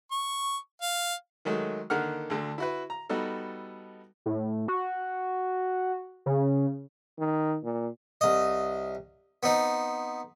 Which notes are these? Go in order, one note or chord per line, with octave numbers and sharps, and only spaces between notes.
C#6
F5
D#3 F#3 G#3 A3
D3 D#3 A#3 A#4 F#5 F6
D2 D3
E4 F#4 B4
A#5
G3 B3 D#4 F#4 A4
A2
F#4
C#3
D#3
A#2
C2 D#5
B3 C4 D#4